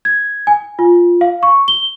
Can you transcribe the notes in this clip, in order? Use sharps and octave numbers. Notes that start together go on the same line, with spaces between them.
G#6
G#5
F4
F5
C#6
G7